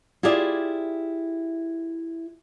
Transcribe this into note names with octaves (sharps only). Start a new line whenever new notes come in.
E4 F4 G4 G#4 D5 E5